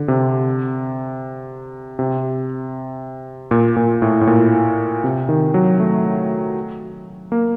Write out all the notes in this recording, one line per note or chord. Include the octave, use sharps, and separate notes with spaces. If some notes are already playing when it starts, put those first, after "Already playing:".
Already playing: D3
C3
C3
A#2
A#2
A2
A2
A#2
C3
D#3
F#3
A3
A#3